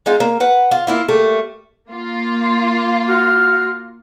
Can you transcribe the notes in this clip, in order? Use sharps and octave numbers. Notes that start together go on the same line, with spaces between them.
G#3 D#4 F4
A#3
B4 F#5
F4
A#3 E4 F4
G3 A3 A#3
A#3 F4
F#4 F6